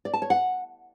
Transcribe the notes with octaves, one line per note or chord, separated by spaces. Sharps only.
D5
A5
C#5
F#5